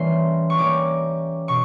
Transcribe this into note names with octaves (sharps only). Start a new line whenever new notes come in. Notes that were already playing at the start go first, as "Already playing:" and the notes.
Already playing: E3 G3 A#3 C#4 C6
C#6
E3 G3 A#3 C#4 D6
B2 C#6